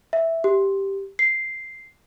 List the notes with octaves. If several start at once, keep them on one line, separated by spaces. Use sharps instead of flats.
E5
G4
C7